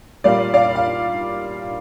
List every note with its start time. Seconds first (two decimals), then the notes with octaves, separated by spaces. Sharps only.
0.24 A#2 G3 A#3 D5 F5
0.54 D5 F5
0.75 F5